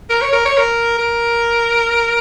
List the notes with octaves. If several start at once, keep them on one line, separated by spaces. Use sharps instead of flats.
A#4
C#5
A#4
C#5
A#4
A#4